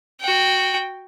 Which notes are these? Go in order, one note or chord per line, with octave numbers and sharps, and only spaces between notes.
F#4 G5